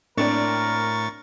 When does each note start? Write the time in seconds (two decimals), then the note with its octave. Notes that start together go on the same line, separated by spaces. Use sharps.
0.18 A2 A#3 C4 D4 A#4 D5 C#6 A6